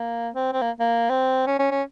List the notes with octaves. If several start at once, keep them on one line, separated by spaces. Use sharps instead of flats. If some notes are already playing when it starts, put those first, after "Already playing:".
Already playing: A#3
C4
C4
A#3
A#3
C4
C#4
C#4
C#4